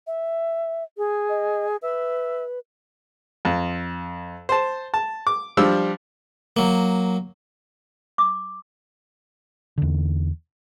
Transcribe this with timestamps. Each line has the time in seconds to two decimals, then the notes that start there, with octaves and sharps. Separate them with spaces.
0.07 E5
0.98 G#4
1.29 D#5
1.82 B4 E5
3.45 F2
4.49 C5 A5
4.94 A5
5.27 D6
5.57 F3 G3 D4 E6
6.57 F#3 A#3
8.18 D6
9.78 E2 D3